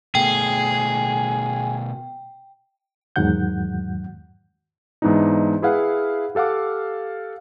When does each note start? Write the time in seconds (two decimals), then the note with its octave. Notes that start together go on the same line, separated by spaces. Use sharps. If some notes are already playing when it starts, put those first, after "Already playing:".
0.15 B2 A3 G#4 G5
3.16 E2 G#2 D#3 F#3 F#5 G6
5.02 G#2 E3 B3 D4 D#4
5.62 E4 G#4 B4 F5 F#5
6.35 G4 A4 F5 F#5 D6